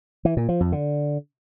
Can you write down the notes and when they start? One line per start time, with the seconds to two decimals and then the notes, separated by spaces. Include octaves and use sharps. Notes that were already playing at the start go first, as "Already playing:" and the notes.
0.25 E3
0.37 A#2
0.49 F3
0.60 F2
0.72 D3